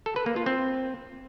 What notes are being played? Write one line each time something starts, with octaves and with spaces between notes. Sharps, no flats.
A4
B4
A#3
F4
C4